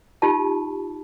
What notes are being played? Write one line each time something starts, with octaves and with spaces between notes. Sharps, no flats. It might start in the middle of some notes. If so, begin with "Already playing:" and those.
D#4 F4 G4 A5